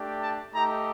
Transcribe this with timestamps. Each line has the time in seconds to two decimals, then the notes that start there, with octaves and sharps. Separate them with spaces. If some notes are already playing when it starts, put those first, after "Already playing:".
Already playing: A3 D4 G4
0.20 A5
0.53 A3 D#4 G4 A#5